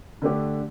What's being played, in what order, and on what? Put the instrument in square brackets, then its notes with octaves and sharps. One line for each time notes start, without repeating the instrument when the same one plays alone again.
[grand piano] D3 A3 D4 G4